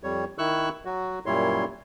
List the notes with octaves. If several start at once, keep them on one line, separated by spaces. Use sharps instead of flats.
F2 G3 C#5
D#3 E4 C#6 E6 F#6
F#3 F#4
F#2 A#2 G3 E4 C#5 C6